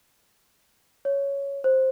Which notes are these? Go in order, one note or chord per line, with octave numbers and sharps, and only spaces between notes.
C#5
C5